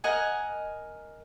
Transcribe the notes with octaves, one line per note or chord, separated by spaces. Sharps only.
A#4 D#5 F#5 G#5